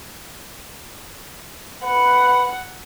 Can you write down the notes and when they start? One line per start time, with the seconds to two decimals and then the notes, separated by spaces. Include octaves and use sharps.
1.84 B4 F#5